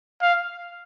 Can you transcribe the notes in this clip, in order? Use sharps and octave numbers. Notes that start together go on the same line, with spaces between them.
F5